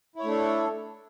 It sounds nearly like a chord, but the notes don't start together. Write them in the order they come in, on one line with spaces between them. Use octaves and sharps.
E4 C#5 A3 D4 A4